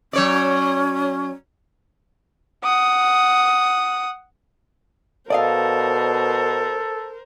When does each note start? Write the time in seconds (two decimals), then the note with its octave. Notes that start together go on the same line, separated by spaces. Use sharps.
0.13 F#3 C#4 C#5 D5
2.64 F#5 D#6
5.30 B2 A4 A#4 C5 D5 D#5 F5